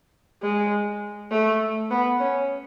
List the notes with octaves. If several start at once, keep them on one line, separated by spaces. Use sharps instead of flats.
G#3
A3
B3
C#4